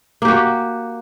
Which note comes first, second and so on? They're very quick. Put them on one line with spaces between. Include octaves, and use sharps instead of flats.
A#3 G4 F#4